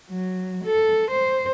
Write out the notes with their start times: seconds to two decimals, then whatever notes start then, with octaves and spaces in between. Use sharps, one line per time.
0.10 F#3
0.65 A4
1.11 C5